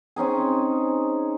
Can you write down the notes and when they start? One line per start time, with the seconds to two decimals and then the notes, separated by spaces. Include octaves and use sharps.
0.16 C4 C#4 D#4 G#4